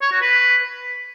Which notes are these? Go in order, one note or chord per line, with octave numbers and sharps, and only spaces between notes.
C#5
F#4
B4